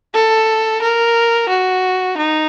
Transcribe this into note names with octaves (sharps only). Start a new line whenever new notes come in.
A4
A#4
F#4
D#4